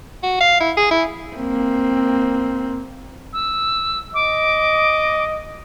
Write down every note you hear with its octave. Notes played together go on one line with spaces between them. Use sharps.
F#4
F5
E4
G#4
E4
A#3 C4
E6
D#5 D6